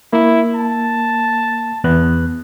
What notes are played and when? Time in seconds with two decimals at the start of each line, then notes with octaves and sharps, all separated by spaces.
0.13 A#3 E4
0.55 A5
1.84 E2 B3 F#6